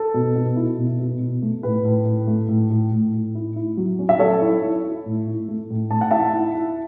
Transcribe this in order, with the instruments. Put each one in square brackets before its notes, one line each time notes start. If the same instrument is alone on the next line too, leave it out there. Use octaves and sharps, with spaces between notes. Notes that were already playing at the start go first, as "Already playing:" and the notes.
Already playing: [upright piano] A4
B2
B2
E4
B2
B2
B2
A3
A2 B4
A2
A2
A3
A2
A2
A2
A2
E4
E4
F#3
C#4
E5
F#3 A4 C#5
E4
E4
E4
A2
E4
A3
A2
A3 A5
F#5
E4 E5 A5
E4
E4